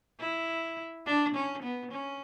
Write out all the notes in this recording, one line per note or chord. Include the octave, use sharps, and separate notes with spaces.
E4
D4
C#4
B3
C#4